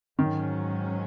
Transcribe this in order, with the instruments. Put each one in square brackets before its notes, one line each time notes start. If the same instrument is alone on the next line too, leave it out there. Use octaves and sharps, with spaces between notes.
[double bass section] G#2 F#3 C#4 [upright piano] D#3